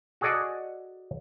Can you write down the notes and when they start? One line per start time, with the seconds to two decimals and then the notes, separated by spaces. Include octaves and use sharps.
0.21 F#4 G#4 A4 D5 D#5 F#5